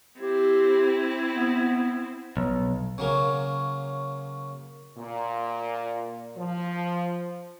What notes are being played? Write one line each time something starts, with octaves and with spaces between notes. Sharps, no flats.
C4 E4 G4
B3
B1
C#3 F#3 A#3
A#2
F3